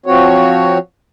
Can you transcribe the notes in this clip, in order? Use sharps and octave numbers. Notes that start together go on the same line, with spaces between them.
F3 C4 F#4 C#5